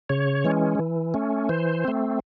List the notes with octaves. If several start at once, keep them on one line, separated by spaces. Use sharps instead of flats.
C#3 C#5
E3 G#3 C#4
E3
A3 C#4
E3 C5
A3 C4